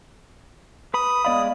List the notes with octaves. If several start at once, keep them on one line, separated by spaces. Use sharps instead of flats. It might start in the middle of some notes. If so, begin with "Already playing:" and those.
B4 B5 D#6
G#3 B3 D5 D#5 F5 B5